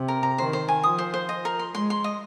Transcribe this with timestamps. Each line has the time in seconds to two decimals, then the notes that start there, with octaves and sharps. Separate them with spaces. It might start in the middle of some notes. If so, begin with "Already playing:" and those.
Already playing: C3
0.08 A#4
0.23 A#5
0.38 D#3 C5
0.53 C5
0.68 G#5
0.83 F3 D#6
0.99 C5
1.14 C5
1.29 D#5
1.45 A#4
1.59 C6
1.75 G#3 C6
1.90 C6
2.04 D#5